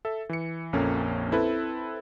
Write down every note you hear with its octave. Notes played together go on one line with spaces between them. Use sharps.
A4 E5
E3 C#7
A#1 F2 A#3 C#4 A4
C4 E4 A4 B4